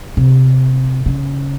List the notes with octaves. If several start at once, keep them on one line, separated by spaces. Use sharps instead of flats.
C3
C#3